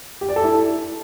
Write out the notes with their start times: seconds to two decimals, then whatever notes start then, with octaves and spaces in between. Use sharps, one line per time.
0.21 G4
0.29 D5
0.36 A4
0.44 E4